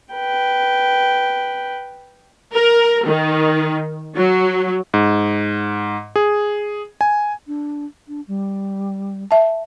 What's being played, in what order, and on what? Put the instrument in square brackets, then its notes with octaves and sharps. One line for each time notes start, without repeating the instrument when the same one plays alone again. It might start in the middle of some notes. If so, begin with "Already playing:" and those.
[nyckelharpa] B4 G5
[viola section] A#4
D#3
F#3
[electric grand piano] G#2
G#4
G#5
[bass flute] D4
D4
G3
[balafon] E5 A5